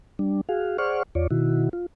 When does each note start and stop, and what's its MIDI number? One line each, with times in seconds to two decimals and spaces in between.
0.19 0.41 55
0.19 0.41 62
0.49 0.77 66
0.49 0.77 68
0.49 0.77 77
0.78 1.03 68
0.78 1.03 72
0.78 1.03 74
0.78 1.03 78
0.78 1.03 85
0.78 1.03 89
1.15 1.27 40
1.15 1.27 65
1.15 1.27 73
1.15 1.27 74
1.31 1.69 47
1.31 1.69 51
1.31 1.69 64
1.31 1.69 66
1.73 1.86 65